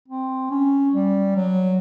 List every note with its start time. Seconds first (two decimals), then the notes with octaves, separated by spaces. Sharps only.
0.08 C4
0.50 C#4
0.94 G3
1.36 F#3